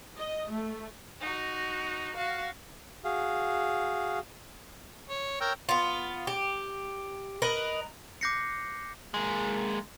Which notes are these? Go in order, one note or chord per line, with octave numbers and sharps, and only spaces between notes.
D#5
A3
D#4 F#4
F#4 F5
F#4 G#4 F5
C#5
A#4 C#5 G5 E6
B3 F4
G4
A#4 B4 D#5
D6 F#6 G6 A#6 C7 C#7
G#3 A#3